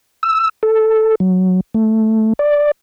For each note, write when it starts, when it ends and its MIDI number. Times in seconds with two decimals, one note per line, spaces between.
0.23 0.49 88
0.63 1.15 69
1.20 1.61 54
1.74 2.33 57
2.39 2.71 74